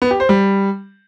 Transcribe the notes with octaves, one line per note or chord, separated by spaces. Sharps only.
B3
G4
C5
G3